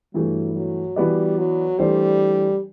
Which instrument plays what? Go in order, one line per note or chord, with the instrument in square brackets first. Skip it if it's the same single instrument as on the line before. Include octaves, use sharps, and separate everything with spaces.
[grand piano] G2 E3 A3 [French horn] F#3
[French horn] F#3
[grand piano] E3 B3 F#4 B4 D5 [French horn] G3
[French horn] F#3
[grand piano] E3 A3 D4 A4 C5 [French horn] G3